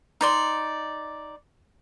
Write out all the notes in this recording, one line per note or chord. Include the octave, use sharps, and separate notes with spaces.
D#4 D5 C6